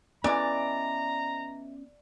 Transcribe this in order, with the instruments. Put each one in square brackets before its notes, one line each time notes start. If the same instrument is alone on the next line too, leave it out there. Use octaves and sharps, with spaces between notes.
[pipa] E3 G#3 [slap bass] B3 C#4 [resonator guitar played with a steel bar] D5 [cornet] A#5